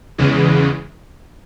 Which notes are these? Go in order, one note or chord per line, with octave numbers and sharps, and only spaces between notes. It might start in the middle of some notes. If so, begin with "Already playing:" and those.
E2 C#3 E3 G#3